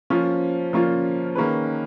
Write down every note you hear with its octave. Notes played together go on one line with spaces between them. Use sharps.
F3 A#3 C#4 F4
F3 A#3 C#4 F4
D#3 A#3 C#4 G#4 B4